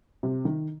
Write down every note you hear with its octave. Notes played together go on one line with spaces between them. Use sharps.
C3
D#3